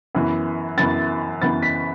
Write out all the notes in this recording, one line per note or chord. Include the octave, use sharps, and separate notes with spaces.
F#2 E3 B3
F#2 E3 B3 A6
F#2 E3 B3 A6
B6